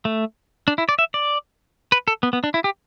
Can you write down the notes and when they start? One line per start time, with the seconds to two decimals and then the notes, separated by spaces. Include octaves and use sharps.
0.05 A3
0.68 D4
0.78 E4
0.89 D5
0.99 E5
1.14 D5
1.92 B4
2.08 A4
2.23 B3
2.33 B3
2.44 D4
2.54 E4
2.64 G4